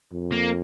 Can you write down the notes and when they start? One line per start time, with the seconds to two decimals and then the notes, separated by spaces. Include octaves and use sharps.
0.13 F2
0.32 A#3